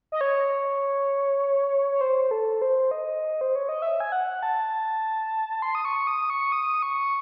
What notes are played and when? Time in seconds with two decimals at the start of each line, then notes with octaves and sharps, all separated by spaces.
0.12 D#5
0.21 C#5
1.92 C#5
2.01 C5
2.31 A4
2.62 C5
2.91 D#5
3.41 C5
3.56 C#5
3.69 D#5
3.82 E5
4.00 G#5
4.12 F#5
4.43 A5
5.62 C6
5.75 D#6
5.85 C#6
6.07 D#6
6.30 C#6
6.52 D#6
6.82 C#6